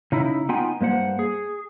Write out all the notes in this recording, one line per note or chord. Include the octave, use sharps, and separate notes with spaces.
C#3 D#4 E4
B3 D#4 F4 G5 G#5
G2 A#3 C5 F#5
G#4